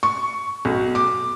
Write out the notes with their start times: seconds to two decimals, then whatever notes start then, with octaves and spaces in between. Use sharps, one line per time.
0.03 C#6
0.65 B1
0.95 D6